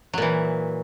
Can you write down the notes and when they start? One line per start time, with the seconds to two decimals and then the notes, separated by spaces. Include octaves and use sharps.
0.13 F#3
0.18 A#2
0.22 E3